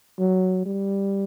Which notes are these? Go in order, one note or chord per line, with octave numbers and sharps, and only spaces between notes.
F#3
G3